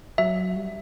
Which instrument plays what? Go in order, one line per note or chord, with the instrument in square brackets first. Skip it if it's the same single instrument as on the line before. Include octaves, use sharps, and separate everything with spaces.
[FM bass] F#3 [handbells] E5
[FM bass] G3